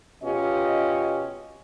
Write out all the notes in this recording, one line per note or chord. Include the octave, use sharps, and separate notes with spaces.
B2 C#4 F4 G4 D#5